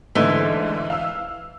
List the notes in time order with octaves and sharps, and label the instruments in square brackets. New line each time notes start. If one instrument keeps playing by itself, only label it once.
[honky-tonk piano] G#2 D3 A3 [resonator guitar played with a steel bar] E3
[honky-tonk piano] F5 E6